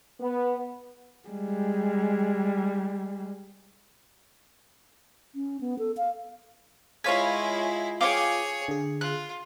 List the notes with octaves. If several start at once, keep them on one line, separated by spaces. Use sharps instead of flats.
B3
G3 G#3
C#4
B3
A4
F5
G#3 E4 F4 B4 C#5 F5 G#5
G#4 C#5 F5 G5 D6
D3 G#4
F4 F#6